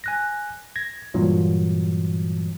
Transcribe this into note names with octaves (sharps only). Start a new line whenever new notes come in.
G#5 F#6 A#6
G#6 A#6
G2 A#2 E3 F#3